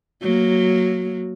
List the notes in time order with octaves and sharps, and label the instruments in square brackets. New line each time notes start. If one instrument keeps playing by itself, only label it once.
[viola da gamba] F#3 A#3